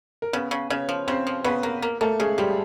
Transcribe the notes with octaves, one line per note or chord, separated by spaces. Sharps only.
A#4
C#3 B3 B4
C#3
C#3 C#4 C#5
F3
C#3 C4 C5
F3
C#3 B3 B4
A#3
A#3
A3 A#3 A4
C#3 G#3 G#4
F3 G3 G4